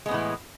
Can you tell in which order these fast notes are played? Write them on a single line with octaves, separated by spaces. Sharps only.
G#3 B3 A2 E3